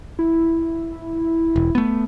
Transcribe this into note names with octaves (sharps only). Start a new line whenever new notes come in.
E4
E1
A3 B3